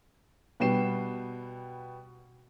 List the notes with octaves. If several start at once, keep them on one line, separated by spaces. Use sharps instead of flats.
B2 G3 B3 G5 C7 E7